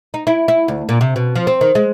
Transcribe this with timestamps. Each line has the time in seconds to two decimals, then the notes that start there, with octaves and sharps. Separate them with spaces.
0.14 D#4
0.27 E4
0.48 E4
0.68 D2
0.89 A#2
1.01 C3
1.16 B2
1.36 F3
1.47 C4
1.61 D#3
1.75 G#3